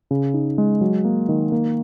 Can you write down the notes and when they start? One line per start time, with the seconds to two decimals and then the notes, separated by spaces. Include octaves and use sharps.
0.11 C#3
0.34 D#4
0.58 G#3
0.81 F#3
1.05 A#3
1.29 D#3
1.52 A#3